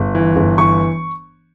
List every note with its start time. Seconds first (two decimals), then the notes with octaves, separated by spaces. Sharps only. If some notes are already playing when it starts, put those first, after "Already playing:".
Already playing: G1
0.15 E3
0.36 G1
0.57 E3 C#6